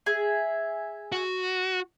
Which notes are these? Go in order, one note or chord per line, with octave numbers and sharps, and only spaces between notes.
G#4 E5
F#4